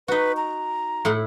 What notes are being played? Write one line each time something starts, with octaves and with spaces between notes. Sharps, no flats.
D#4 F#4 B4
A#5
A2 E4 F#5